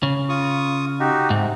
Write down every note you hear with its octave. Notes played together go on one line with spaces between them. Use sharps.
C#3
F4 C#6 D#6
D#4 F#4 G4
G#2 C3